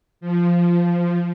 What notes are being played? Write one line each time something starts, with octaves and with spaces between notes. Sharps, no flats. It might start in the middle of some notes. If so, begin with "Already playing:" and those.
F3